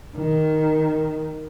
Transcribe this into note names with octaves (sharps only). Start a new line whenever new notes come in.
D#3